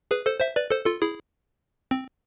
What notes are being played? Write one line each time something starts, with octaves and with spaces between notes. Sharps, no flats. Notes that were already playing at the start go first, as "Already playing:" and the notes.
G#4 B4
A4 C5
C5 E5
B4 D5
A4 C5
F4 A4
E4 G#4
C4